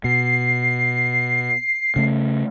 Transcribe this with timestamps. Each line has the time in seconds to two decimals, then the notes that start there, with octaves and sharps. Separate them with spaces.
0.04 B2 C7
1.96 C#3 A3